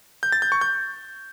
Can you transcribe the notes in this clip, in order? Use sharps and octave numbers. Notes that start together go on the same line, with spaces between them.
G6
A6
G6
C#6
G6